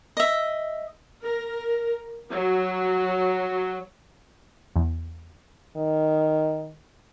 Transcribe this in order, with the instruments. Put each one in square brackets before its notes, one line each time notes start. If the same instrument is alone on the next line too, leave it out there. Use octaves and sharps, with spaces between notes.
[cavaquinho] D#5 E5
[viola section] A#4
F#3
[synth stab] E2
[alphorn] D#3